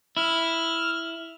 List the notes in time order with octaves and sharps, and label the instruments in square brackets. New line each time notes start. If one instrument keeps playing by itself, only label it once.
[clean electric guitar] E4 [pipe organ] F6